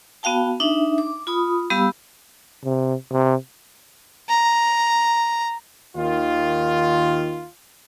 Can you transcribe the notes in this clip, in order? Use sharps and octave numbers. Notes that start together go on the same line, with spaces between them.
B3 F#4 F5 G5 A5
D4 D#4 E5
D6
F4 B5 D#6
G3 B3 G4 F5 B5 E6
C3
C3
A#5
D#2 D#3 F4